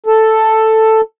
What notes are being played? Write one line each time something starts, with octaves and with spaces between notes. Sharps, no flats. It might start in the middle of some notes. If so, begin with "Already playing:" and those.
A4